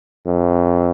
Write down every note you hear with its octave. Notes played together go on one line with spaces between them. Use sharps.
F2